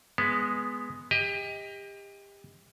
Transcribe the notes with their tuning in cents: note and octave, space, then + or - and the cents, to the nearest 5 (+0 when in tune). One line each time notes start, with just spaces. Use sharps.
G#3 +0 B3 +0
G4 +30 D#5 +20